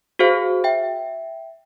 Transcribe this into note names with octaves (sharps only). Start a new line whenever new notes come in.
F#4 G#4 C5 F5
E5 G5